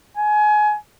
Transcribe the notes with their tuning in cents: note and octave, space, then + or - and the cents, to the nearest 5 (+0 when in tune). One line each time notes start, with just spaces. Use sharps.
G#5 +25